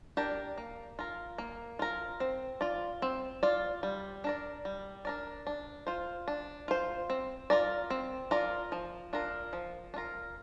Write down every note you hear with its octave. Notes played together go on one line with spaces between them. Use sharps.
D4 G4 A#4 D5
A#3
F4 A#4
A#3
F4 A#4
C4
F4 D5
C4
F4 D5
G3
D4 A#4 D5
G3
D4 A#4 D5
D4
F4 C5
D4
F4 C5
C4
F4 A#4 D5
C4
F4 A#4 D5
F3
D4 F4 A#4
F3
D4
F4 A#4